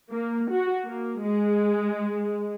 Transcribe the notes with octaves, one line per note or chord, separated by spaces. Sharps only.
A#3
F#4
A#3
G#3